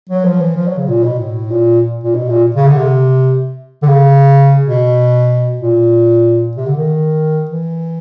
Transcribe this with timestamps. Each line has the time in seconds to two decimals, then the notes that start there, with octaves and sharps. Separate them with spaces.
0.09 F#3
0.25 F3
0.41 E3
0.57 F3
0.68 F#3
0.78 C#3
0.88 A#2
1.04 B2
1.19 A2
1.51 A#2
2.04 A#2
2.15 B2
2.29 A#2
2.56 C#3
2.67 D3
2.77 C3
3.82 D3
3.88 C#3
4.67 B2
5.61 A#2
6.57 C3
6.67 D3
6.77 D#3
7.51 E3